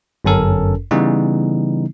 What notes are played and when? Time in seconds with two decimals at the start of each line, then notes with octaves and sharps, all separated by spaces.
0.25 G1 F#2 C#4 A4 A#4
0.91 C#3 E3 G3 B3 D#4